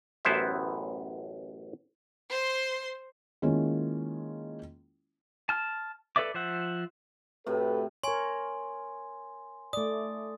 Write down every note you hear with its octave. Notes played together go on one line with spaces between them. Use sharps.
A1 F#2 B3 E4 C5 E5
C5 C6
D#3 G#3 A#3 C#4 E4 F4
A5 F6
A4 B4 D5 E5 D6
F3 C5 E5 F#5
A2 C3 F#4 A4 B4
A#4 C#5 G#5 C6
A3 D5 D#6